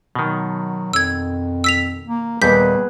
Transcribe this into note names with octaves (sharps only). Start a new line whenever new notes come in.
B2 D#3 F#3
F2 E6 G#6
E6 B6 F7
A#3
D#2 A#2 G3 B3 G#4 B4 G6 B6